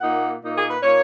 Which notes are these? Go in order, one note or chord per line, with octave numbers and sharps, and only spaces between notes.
A#2 A#3 D#4 F#5
A#2 A#3 D#4
G#4
B4
A#2 A#3 D#4 C#5